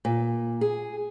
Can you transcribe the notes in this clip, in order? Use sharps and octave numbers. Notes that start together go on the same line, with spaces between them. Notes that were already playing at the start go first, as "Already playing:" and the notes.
A#2
G#4